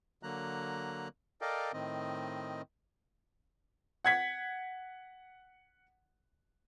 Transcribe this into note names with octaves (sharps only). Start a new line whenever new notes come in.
D3 F#3 A#3 A#5 F#6
A4 A#4 D5 D#5 F5 G5
A2 D#3 C4 D#5
F#5 G#6 B6